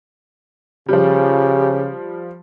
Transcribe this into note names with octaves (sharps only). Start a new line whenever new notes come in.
C#3 F3 G3 G4